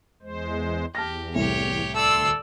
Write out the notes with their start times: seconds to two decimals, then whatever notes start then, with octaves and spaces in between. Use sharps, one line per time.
0.22 E2 G#3 C5
0.95 E2 G4 A5 F6 A#6
1.35 C2 A2 G4 C#5
1.95 D2 A4 D5 C6 E6